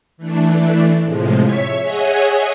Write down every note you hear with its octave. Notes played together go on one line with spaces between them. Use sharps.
E3 A3 D4
A2 C3 F3 G#3
C#5 E5 C#6 B6 C#7
G#4 C#5 D#5 E5 F#5 G#5